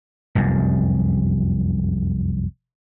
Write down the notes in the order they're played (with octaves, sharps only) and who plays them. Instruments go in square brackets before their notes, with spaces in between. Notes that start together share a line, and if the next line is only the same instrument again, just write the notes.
[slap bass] F1 C2 F#2